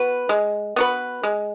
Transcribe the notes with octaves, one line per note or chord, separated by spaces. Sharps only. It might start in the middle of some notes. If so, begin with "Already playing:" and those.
Already playing: B3 F#4 B4
G#3
B3 F#4 B4
G#3